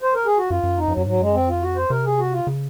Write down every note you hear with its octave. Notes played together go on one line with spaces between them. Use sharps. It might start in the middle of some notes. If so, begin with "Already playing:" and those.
C5
A#4
G#4
F#4
F#2 F4
F#2
F2 D#4
F#2 F3
F#3
F#2
G#2 F#3
F#2 G#3
F2 C4
F4
F#4
C5
C3 A#4
G#4
F#4
F4
C#3